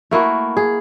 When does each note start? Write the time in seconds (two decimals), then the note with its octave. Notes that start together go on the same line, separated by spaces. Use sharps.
0.11 A3 A#3 E4 F#4
0.57 G#4